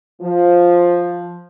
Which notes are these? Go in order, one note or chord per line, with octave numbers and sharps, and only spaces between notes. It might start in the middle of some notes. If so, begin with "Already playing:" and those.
F3